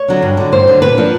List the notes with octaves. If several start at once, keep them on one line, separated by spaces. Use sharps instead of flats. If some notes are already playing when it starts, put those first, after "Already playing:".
Already playing: C#5
D3 F#3 B3
G2
D3 F#3
G2 C5
D3 F#3
A#2 B4
F3 A#3 D4